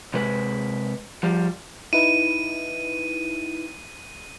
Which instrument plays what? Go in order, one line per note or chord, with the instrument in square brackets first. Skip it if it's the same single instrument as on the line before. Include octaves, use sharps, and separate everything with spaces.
[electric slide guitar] C3 G#3 B4
F3 G3
[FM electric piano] D#4 E4 B4 [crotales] D#7